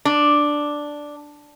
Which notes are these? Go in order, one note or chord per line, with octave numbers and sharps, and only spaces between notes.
D4